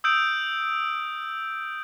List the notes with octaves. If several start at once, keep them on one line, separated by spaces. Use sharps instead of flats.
D#6 E6 G6 D7